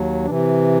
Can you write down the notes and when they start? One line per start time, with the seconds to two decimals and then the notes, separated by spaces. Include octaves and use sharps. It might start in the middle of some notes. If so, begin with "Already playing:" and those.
Already playing: D#2 F#3
0.25 C3 E3 D4